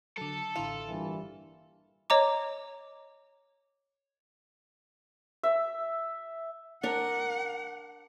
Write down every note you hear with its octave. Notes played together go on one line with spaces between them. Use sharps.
D3 F#3 A4
A1 D3 E4 F4
G2 A#2 E3
C#5 D#5 A#5 D6
E5
D4 A#4 F#5